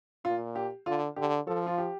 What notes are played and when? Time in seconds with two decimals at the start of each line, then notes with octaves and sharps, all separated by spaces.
0.25 A#2 F4
0.56 G4
0.86 D3 F4
1.16 D3 G4
1.47 F3 A4
1.67 F4
1.78 G4